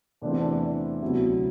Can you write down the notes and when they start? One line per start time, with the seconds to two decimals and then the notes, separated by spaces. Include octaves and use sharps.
0.22 E2 C3 E3 A3 C4 D4
0.31 E4
0.41 D4
1.01 D2 C3 F#3 B3 E4